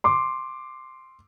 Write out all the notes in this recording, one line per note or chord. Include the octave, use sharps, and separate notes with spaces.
C6 D6